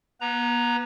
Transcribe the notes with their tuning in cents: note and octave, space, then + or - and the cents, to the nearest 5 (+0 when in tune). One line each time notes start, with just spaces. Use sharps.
B3 -40 B4 +0 A#5 +0